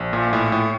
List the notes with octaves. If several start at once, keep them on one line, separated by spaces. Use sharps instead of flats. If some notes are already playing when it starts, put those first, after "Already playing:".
Already playing: A#1
A#2
A2
A2